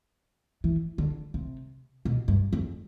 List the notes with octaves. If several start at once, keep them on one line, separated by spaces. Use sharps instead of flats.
E3
D3
C3
B2
G2
F2